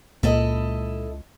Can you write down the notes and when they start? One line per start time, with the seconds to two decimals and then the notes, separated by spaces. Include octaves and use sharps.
0.23 C#2 A#2 G#3 A#3 E4 A4 D#5